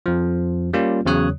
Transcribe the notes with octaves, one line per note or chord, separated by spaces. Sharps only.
F2 F3
G3 A#3 C#4 F4
E2 C#3 F#3 C#5 D#6 F#6